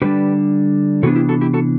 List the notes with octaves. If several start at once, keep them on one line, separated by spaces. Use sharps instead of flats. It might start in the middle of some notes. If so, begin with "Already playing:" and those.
D3 G3 D4 G4 B4
C3 E3 B3 D4 F#4 A4
E4 G4
F#4 A4
E4 G4
F#4 A4